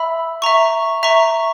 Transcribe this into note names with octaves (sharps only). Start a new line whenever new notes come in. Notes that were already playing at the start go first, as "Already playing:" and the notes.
Already playing: E5 B5 E6
E5 A#5 C#6
E5 A#5 C#6